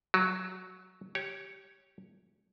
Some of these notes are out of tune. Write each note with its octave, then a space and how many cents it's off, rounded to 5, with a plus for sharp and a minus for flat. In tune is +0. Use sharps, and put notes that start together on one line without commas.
F#3 +0 F#4 +0
G4 -15 C#5 +0